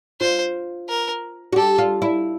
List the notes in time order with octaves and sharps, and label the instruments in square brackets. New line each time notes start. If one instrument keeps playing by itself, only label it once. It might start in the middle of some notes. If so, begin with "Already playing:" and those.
[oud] F4 [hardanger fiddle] C5
[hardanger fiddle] A#4
[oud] F#4
[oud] G4 [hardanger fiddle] A4
[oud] F4
E4